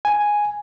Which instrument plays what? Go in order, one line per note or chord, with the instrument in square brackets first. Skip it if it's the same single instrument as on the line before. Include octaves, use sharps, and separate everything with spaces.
[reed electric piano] G#5